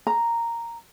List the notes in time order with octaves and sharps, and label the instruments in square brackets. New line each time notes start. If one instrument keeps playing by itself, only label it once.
[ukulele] A#5